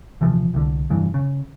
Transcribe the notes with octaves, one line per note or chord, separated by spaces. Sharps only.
D#1 C3 E3 F3
C2 D3
F1 G2 E3
C#3